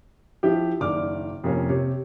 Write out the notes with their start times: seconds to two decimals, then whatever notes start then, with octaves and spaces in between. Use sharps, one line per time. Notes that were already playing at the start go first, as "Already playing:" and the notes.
0.43 F3 E4 G4
0.80 F#1 D#3 D4 D5 D6 F6
1.44 F2 C3 A#3 C#4
1.69 C3 C#5